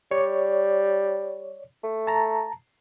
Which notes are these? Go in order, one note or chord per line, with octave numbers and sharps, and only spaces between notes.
G3 C#5 D5
A3
A5 A#5